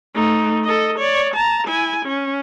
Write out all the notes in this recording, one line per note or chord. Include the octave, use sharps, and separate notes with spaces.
A3 D#4
A4 D#5
C#5 D5
A5 A#5
E4 G#5
C#4